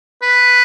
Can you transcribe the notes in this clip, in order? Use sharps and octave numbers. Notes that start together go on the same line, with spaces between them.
B4